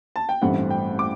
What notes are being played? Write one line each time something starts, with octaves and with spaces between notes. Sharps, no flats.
A5
G5
A1 G2 E3 A3 C4 F#5
G5
D6